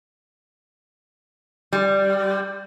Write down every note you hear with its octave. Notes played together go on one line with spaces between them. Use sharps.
G3